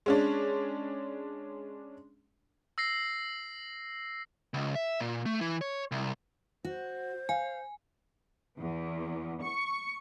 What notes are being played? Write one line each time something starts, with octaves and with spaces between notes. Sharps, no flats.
G#3 C#4 D4
E6 A#6 C7
C#2
E5
A#2
A3
E3
C#5
C2
F#4 C5
F5 G#5
E2
C#6